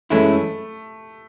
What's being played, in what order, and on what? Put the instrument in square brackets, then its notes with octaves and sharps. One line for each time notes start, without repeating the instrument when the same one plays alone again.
[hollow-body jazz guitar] F#2 E3 G#3 C#4 E4 [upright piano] A3